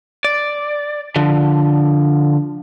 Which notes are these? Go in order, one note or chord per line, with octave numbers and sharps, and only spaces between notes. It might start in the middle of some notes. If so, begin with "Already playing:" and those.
D5
D3 F3